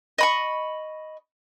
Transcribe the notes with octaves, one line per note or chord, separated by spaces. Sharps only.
D#5 B5 C#6